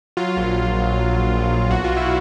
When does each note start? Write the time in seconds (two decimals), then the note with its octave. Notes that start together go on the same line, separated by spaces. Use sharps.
0.17 F#3 F4
0.36 A#1
0.56 A#1
0.74 A#1
0.95 A#1
1.13 A#1
1.32 A#1
1.51 A#1
1.71 B1 F#4
1.84 F4
1.90 B1
1.97 E4